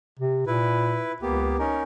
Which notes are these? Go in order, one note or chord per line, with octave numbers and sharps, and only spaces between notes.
C3
A#2 E4 B4
C#2 A#3 B3 G4
C#4 D#4 A#4